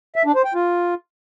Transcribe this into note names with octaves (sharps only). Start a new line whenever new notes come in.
E5
D4
C5
G5
F4